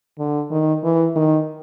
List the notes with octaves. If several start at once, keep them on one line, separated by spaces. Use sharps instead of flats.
D3
D#3
E3
D#3